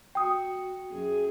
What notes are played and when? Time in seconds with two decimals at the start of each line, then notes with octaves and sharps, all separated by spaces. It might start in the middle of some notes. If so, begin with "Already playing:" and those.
0.15 F#4 G5 D#6
0.92 F#2 G#4